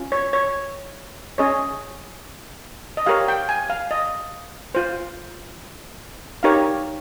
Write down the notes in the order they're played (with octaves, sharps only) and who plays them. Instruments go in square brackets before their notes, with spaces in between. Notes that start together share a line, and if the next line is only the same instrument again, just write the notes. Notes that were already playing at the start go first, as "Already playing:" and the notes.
Already playing: [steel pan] C#4 F4
C#5
C#5
C#4 G#4 C#5 D#5
D#5
G4 A#4 C#5 F5
G5
G#5
F5
D#5
F4 C5
D#4 G4 A#4 C#5 F5